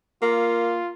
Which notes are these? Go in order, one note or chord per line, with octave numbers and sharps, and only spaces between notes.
A#3 F4